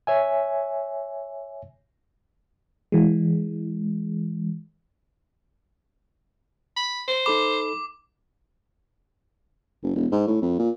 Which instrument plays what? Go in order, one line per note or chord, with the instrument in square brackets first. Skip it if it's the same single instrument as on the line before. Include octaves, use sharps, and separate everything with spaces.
[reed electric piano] C#5 E5 G#5
[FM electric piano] E3 G#3
[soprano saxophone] B5
C5
[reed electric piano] D#4 A4 B5 [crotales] D6
[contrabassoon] F#1
E1
G#2
A2
F2
A#2